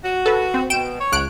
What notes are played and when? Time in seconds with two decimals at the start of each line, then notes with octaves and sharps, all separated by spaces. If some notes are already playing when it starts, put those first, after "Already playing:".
0.04 F#4
0.26 A4 B4
0.54 C4
0.70 B2 G5 D7 E7
1.00 C#5
1.12 C#2 F#6 D7